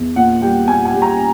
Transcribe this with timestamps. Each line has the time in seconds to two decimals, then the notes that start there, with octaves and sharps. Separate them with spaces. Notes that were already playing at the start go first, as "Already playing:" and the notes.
Already playing: E2
0.16 A#2 F#5
0.41 G3 G5
0.68 A#2 G#5
0.85 G#5
0.94 G3
1.02 A#5